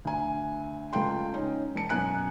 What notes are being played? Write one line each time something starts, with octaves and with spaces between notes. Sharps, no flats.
D2 G#5
C#2 A3 F4 G5 C6
C#4 D#4
E1 A5 C#7
F#2 B2 F#3 G#5 F#6 C#7